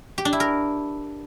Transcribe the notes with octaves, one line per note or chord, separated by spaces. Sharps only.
G4
D4
E4
A#4